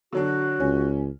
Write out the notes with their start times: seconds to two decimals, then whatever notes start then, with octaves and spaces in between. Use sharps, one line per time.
0.13 D3 F#3 D4 F#4
0.60 C#2 C#4